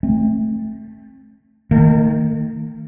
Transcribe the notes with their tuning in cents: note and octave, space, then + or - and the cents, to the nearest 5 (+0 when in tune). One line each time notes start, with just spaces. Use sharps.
A3 -5 C4 +35
D#3 +0 A3 +45